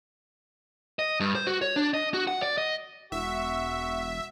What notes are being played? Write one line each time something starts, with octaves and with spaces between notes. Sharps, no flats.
D#5
G2
C5
F#4
C#5
D4
D#5
F#4
F#5
D5
D#5
E1 F#4 E5